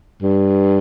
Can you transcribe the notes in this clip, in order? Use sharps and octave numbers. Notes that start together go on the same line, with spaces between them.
G2